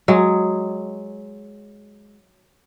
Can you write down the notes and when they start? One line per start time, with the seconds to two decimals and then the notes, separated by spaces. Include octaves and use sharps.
0.08 F#3 G#3